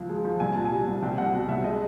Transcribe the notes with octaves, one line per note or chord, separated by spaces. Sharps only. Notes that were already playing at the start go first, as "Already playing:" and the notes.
Already playing: C#2 F3
G#3
F3
C2 G#5
A#2 A5
G#5
G3
C2
C2 G5
C2 F#5
B2
C2 E5
G#3 D#5